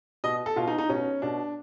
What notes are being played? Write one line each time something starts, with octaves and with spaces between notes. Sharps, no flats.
B2 D#5
A4
B2 F4
D#4
D#4
B2 C#4
B2 D4